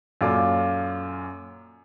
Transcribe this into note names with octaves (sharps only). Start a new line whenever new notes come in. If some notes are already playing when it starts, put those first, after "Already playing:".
F#2 A#2 F4 A4 D5 D6